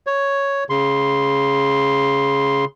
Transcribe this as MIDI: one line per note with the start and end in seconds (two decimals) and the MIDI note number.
0.07 0.64 73
0.70 2.65 49
0.70 2.65 84